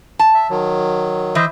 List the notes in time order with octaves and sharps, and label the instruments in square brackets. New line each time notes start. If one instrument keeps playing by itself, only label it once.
[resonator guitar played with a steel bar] A5
[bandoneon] E5
D#3 F#3
[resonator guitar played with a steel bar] E3 [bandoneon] C5 D#5 E5